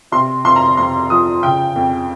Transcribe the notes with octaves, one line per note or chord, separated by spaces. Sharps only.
C3 C6
F2 C6
A#5
F2 C6
F3 D#6
C#3 G5
F2